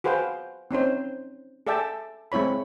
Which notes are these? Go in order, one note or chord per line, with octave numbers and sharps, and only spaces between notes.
F#4 G#4 B4 C5 F5 G5
C4 C#4 D#4 C5
G#4 A4 D5 E5 G5 A5
G#3 C4 E4 C#5 B5